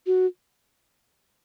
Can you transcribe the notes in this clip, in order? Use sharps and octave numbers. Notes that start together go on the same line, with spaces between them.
F#4